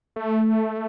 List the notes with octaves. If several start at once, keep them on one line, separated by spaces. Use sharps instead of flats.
A3